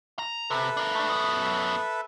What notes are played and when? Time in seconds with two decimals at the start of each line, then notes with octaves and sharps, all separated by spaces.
0.19 A#5
0.50 C3 A4 B4 E5
0.77 D4 A#4
0.95 A3 D4
1.09 F#2 B3